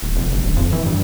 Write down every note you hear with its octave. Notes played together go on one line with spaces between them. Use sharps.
D#1
F1
G1
D#1
F2
E3
G2